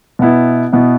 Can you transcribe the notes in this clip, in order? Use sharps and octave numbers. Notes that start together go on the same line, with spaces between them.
B2 B3 E4
B2 B3 E4